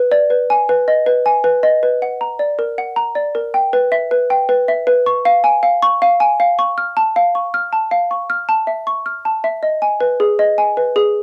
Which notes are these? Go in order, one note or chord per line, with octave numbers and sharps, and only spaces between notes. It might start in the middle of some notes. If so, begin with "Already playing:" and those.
Already playing: B4
D5
B4
G#5
B4
D#5
B4
G#5
B4
D#5
B4
F#5
A#5
D5
A#4
F#5
A#5
D5
A#4
G5
B4
E5
B4
G5
B4
E5
B4
C#6
F5
G#5
F5
C#6
F5
G#5
F5
C#6
F6
A5
F5
C#6
F6
A5
F5
C#6
F6
A5
E5
C#6
F6
A5
E5
D#5
G#5
B4
G#4
D#5
G#5
B4
G#4